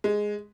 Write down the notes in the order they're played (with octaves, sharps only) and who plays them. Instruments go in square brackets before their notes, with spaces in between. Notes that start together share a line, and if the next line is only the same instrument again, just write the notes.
[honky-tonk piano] G#3